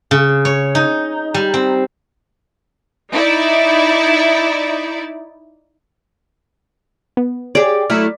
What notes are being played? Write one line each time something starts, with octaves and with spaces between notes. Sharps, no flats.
C#3
C#5
D#4
G3
C4
D#4 E4 D5
B3
G4 G#4 C#5 D5
F#3 A3 E4 F6